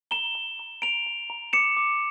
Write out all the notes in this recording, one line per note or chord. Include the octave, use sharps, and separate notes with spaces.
A#5 E7 G7
A#5
A#5
A#5 D7 F7
A#5
A#5
D6 C#7 E7
D6